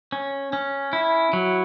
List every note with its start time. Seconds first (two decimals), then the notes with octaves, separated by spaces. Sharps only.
0.12 C#4
0.53 C#4
0.93 E4
1.33 F#3